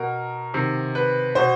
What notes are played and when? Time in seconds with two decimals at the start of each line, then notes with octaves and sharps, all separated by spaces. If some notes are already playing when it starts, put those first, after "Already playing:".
Already playing: B2 A#4
0.53 C3 D#3
0.95 B4
1.35 B2 C5